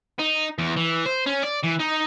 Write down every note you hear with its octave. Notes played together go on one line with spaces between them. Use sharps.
D#4
E2
E3
C5
C#4
D5
E3
D#4